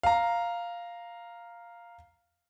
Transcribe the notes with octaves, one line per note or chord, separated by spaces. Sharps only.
F5 A#5